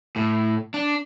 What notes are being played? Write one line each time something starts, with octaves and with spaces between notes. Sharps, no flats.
A2
D4